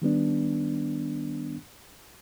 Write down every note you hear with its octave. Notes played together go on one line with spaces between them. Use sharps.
D#3 G3 B3 D4